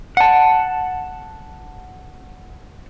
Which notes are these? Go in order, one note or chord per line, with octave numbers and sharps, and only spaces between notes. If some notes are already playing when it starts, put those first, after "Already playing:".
F#5 A5